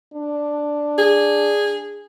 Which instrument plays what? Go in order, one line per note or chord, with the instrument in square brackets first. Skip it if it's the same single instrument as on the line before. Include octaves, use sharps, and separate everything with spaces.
[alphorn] D4
[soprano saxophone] G#4